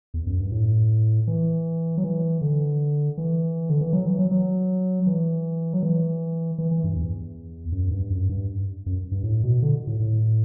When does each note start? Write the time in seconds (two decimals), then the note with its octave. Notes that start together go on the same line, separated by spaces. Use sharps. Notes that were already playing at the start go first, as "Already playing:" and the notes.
0.14 E2
0.27 F#2
0.40 G2
0.52 A2
1.27 E3
1.98 F#3
2.04 E3
2.41 D3
3.18 E3
3.69 D3
3.81 E3
3.93 F#3
4.06 E3
4.19 F#3
4.31 F#3
5.07 E3
5.73 F#3
5.83 E3
6.58 E3
6.71 E3
6.84 G2
6.96 E2
7.72 F#2
7.91 G2
8.10 F#2
8.29 G2
8.86 F#2
9.12 G2
9.24 A2
9.43 B2
9.62 D3
9.87 A2
10.00 A2